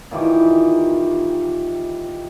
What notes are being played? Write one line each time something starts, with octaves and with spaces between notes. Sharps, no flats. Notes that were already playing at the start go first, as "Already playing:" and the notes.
A#2 D#3 E3 G4